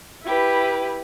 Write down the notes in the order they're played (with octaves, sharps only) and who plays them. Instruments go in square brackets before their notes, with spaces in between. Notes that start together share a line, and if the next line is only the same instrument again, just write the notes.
[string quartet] E4 G4 B4